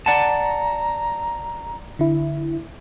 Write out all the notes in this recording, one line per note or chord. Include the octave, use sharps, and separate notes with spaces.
D5 F#5 A5 A#5
D3 E4